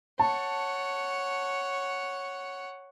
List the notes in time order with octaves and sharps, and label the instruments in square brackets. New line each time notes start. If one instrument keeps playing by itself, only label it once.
[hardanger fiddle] C#5 F#5 [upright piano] A5